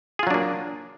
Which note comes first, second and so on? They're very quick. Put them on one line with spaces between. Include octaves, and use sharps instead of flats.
G#4 F4 F#3 D4 A#3